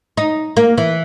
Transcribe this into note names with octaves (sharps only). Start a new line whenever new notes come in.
D#4
A#3
E3